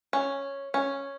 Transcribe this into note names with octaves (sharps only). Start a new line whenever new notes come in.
C#4
C#4